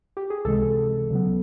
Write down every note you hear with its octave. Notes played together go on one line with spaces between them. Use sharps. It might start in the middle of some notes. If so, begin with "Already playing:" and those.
G4
G#4
C#2 C3 E3 G#3 A4
C#3 F#3 B3